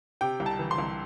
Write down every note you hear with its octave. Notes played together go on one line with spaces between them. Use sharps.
C3 G5
C2
A5
E3
C6
C2